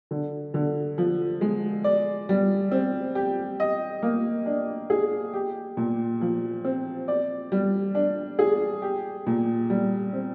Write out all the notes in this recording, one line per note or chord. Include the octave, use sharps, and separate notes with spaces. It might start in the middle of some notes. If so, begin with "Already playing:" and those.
D3
D3
F3
G#3
D5
G3
C4
G4
D#5
A#3
D4
G#4
G4
A#2
F3
C4
D5
G3
D4
G#4
G4
A#2
G3
C4